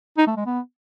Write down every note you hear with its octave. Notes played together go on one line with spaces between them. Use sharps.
D#4
A3
G#3
B3